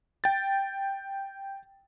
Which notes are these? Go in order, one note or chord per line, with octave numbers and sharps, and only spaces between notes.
G5 A6